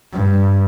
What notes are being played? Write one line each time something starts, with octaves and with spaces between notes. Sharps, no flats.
G2